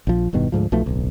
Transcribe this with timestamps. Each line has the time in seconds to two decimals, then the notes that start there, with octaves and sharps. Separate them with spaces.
0.07 A#1 F3
0.33 E1 G2 B2 D#3
0.52 D2 G#2 F3
0.72 B1 B2 F3 A3
0.86 D1 B1